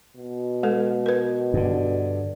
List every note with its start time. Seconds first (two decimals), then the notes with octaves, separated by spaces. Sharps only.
0.17 B2
0.63 G#3 A4 B4
1.06 A#4 B4
1.54 G2 D3